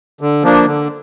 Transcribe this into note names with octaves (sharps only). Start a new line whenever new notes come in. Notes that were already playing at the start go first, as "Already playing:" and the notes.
D3
F3 A#3 D4
D3